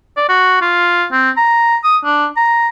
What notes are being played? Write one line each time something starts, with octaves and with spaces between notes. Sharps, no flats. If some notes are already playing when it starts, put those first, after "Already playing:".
D5
F#4
F4
C4
A#5
D#6
D4
A#5